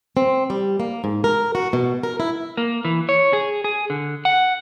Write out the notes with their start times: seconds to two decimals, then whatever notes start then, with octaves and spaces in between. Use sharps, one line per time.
0.17 C4
0.50 G3
0.80 A#3
1.04 G#2
1.24 A#4
1.55 F#4
1.73 B2
2.03 A#4
2.20 E4
2.57 A#3
2.85 E3
3.09 C#5
3.33 G#4
3.64 G#4
3.90 D3
4.25 F#5